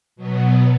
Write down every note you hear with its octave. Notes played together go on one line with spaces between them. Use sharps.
B2 F#3 B3